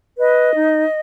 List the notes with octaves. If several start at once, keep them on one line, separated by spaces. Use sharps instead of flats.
B4 D#5
D#4